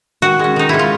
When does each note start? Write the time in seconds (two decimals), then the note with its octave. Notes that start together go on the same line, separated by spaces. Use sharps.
0.22 D#3 F#4
0.39 G#3 C#4
0.56 D#3 D#4
0.69 G#3 C#4 E4
0.79 F4